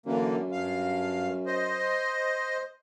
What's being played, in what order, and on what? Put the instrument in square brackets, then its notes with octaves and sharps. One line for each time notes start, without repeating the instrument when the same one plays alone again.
[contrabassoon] F#2 [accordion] D3 E3 A#3
[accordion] G2 F5
C5 D#5